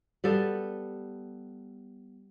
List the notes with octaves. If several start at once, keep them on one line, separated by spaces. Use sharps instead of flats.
G3 B3 A4